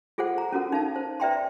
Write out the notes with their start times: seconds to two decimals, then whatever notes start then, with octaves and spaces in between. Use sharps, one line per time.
0.18 F4 G#4 A4 C5 F#5
0.38 A#5
0.52 C#4 F4 F#4 A4 A#4
0.72 D#4 F5 A5
0.96 C5
1.20 B4 D5 E5 G5 A#5 C6